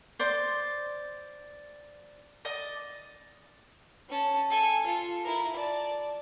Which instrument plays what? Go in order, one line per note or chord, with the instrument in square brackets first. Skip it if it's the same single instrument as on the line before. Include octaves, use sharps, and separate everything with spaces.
[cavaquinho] C5 D5 C6
D5 D#5 D#6
[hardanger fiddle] C#4 A5
A4 G#5
F4 A4
E4 A#4
D5 A5